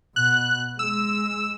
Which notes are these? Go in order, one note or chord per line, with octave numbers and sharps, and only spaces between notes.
B2 F#6
G#3 E6